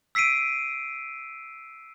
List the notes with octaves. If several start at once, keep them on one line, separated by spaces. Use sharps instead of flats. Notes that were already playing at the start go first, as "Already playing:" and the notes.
E6 B6 C7 D7 D#7